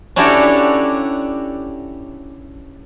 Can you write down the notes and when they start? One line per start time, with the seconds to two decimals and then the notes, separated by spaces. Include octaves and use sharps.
0.16 C#4 D4 E4 F#4 G4 A4